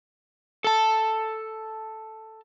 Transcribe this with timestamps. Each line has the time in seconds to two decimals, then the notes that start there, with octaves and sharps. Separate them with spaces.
0.64 A4 A5